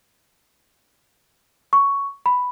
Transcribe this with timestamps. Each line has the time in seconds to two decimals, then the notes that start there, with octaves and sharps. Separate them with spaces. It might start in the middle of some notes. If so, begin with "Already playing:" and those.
1.73 C#6
2.26 B5